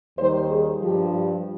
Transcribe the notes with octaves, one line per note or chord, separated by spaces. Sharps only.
D#2 D#3 G3 C5
G#4
G2 F3 G4